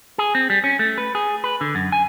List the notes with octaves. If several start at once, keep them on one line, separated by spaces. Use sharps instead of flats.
G#4
C4
G3
C#4
A3
B4
G#4
B4
D3
F#2
G#5